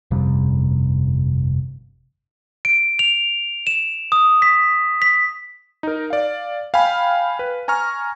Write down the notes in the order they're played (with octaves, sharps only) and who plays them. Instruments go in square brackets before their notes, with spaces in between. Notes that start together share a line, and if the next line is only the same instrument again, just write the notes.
[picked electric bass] G1 F2 C3 G3
[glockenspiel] D7
F7
E7
D#6
B6
B6
[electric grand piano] D#4 A#4
D5 F5
F5 G5 G#5 B5 F6
B4
G#5 A#5 C#6 F6